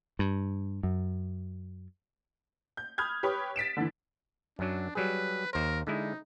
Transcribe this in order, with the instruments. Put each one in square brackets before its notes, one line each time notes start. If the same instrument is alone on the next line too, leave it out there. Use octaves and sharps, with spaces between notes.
[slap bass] G2
F#2
[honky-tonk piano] G6
B5 D#6 F6 G6 G#6
G4 B4 C#5 B5 D#6
A6 B6 D7 E7
D3 E3
[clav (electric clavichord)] F#2 F#3 [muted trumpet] D4
[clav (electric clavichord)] F#3 G3 G#4 [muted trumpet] B4
[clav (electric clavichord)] D#2 C5 [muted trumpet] A#4
[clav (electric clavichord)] D3 G#3 E4 [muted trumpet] D#4